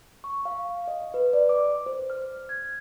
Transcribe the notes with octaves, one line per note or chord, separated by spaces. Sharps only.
C#6
F5
D#5
B4
D5
D6
C5
F6
G#6